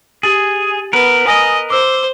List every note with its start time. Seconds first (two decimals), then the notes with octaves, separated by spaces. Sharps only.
0.23 G4 G#4 A6 F#7
0.93 B3 A#4 B4
1.27 D#5 G#5 D#6 A#6
1.70 C5 D6 E6